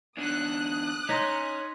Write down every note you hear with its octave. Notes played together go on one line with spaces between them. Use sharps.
E2 D3 D#6 F#6
C#4 D#4 C6 A#6 B6